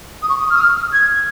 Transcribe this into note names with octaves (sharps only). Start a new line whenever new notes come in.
D#6
C#6
D#6
F6
D#6
F6
G#6